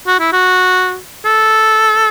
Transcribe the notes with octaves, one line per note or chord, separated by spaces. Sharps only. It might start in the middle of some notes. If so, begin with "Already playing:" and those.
F#4
E4
F#4
A4